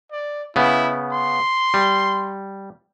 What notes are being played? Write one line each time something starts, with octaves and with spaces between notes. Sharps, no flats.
D5
C#3 B3 E4
C6
G3